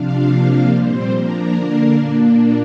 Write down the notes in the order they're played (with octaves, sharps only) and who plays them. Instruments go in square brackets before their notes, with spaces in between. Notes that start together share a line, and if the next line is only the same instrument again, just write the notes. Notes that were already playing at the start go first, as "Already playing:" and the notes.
Already playing: [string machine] C3 F3 D4 F5
C3 F3 A#3 D4
A#2 G3 C4 C5
F3 A#3 D4 A#4
D3 A#3 D4
A#2 A#3 D4